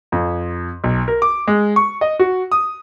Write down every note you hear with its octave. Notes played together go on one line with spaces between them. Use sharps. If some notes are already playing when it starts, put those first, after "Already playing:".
F2
B1
A#4
D6
G#3
C#6
D#5
F#4
D#6